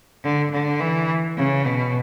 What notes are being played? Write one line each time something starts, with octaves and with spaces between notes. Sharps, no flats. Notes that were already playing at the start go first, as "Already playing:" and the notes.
D3
D3
E3
C#3
B2